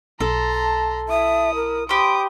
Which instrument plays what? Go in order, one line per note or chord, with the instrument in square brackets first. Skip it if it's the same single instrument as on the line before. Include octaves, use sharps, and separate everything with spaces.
[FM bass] B1 [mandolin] A4 [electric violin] A#5 C6
[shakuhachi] A5
[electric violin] E4 D#6 [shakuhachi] E5
[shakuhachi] A#4
[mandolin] G4 C5 [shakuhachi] B5 [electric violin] D6 D#6